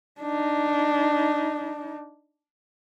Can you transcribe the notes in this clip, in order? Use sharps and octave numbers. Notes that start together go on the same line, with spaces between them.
D4 D#4